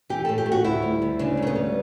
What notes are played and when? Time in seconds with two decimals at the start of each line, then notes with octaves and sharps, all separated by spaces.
0.09 E3 G4
0.25 A2 A4
0.38 G4
0.46 A3
0.52 F#4
0.64 D2 E4
0.82 G3
1.02 D2
1.19 C#3 D4
1.37 D2
1.42 A3
1.47 B3
1.55 G3